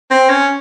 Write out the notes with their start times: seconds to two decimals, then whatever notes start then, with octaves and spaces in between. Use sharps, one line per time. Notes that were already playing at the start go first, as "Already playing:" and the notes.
0.11 C4
0.29 C#4